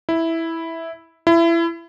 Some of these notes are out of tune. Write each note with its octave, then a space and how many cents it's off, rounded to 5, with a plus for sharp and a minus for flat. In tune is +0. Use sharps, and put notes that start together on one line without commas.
E4 -5
E4 +25